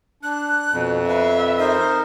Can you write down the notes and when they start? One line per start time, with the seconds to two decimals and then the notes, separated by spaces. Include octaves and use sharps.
0.23 D4 F#6
0.73 F2 B2
1.08 B4 E5 F5
1.59 D#4 A#4 C5